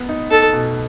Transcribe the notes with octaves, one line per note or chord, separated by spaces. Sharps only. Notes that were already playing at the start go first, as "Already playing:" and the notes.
Already playing: B3
D#4
D#4 A4
B2